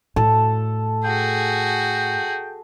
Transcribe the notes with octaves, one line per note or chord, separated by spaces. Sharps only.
A2 A4
F#4 G#4 G5